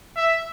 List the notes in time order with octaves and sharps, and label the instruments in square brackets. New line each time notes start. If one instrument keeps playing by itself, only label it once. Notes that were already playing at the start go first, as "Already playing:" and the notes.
[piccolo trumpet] E5